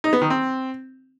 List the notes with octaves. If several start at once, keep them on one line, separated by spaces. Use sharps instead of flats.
D#4
B3
D#3
C4